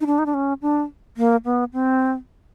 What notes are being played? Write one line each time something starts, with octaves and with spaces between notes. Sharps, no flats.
D#4
D4
D#4
D4
C#4
D4
A#3
B3
C4